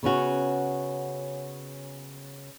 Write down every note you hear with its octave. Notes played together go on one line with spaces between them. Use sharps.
C#3 B3 C#4 F#4